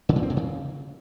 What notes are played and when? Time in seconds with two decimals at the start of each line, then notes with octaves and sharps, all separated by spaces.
0.09 C#3
0.16 A#2
0.23 C4
0.30 B2
0.37 C#3